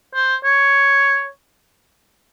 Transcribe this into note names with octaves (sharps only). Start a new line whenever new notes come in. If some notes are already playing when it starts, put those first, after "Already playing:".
C5
C#5